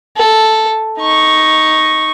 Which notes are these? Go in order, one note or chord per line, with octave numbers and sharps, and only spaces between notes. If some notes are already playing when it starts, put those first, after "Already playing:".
A4
D#4 C#6